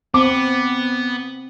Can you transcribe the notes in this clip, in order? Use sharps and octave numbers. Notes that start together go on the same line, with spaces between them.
B3 C4 D6